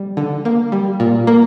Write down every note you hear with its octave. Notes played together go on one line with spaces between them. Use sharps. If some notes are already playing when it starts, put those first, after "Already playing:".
Already playing: G3
D3
A#3
G3
A#2
A#3